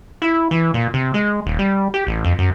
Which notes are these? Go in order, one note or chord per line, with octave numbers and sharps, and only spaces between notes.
E4
E3
A#2
C3
G#3
D#1
G3
G4
A1
F2
F#2